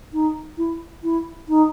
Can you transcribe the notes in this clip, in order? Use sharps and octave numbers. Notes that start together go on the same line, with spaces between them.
D#4
E4
E4
D#4